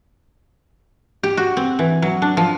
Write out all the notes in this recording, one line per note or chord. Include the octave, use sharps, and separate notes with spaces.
G4
F#4
C4
E3
F#3
D4
F3